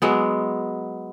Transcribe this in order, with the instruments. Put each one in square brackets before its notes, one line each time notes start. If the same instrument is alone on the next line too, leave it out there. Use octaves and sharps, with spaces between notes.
[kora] F#3 G#3 B3